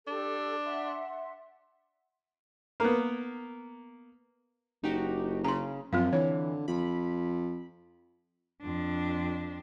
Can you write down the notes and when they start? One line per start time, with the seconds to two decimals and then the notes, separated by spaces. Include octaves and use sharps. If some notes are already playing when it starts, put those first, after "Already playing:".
0.07 D4 G4 A4
0.64 E5 F#5 C6
2.80 A#3 B3
4.84 F#1 D#4 F#4 G4
5.44 C#3 A#5 C6
5.93 F#2 F3 C4 F4 F5
6.13 D3 E3 C#5
6.68 F2 B5
8.62 F2 D4